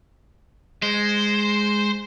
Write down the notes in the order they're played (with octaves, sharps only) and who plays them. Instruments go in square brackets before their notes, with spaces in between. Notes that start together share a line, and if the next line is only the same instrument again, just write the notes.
[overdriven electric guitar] G#3 [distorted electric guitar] C5